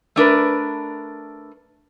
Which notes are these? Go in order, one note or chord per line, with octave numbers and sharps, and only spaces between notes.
A3 D4 A#4 B4